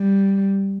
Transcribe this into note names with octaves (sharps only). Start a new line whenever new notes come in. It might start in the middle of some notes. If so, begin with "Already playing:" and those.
Already playing: G3